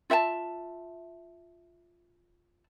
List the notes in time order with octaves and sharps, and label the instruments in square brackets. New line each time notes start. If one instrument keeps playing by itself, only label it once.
[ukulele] F4 E5 F#5 A5